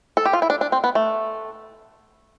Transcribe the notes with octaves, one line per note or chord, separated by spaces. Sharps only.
A4
G4
F4
E4
D4
D4
C4
B3
A3